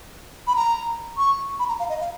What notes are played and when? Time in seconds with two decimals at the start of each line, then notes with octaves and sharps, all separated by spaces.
0.47 B5
0.56 A#5
1.18 C#6
1.59 B5
1.69 A#5
1.80 F5
1.89 D#5
2.00 F5